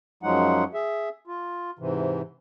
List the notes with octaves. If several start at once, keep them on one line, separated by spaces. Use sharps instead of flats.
F#2 F3 F#3 G#3 D#4 F#5
G#4 E5
F4
G#2 C3 E3